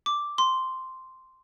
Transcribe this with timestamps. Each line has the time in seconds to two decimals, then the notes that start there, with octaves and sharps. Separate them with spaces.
0.06 D6
0.38 C6